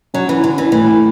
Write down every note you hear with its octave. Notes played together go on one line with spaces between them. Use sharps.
F#3 C#4
E3
D3 C#4
E3
A2 E3